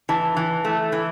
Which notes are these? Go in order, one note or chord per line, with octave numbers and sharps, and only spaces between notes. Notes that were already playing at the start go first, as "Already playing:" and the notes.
E3 A5
E3
A3
E3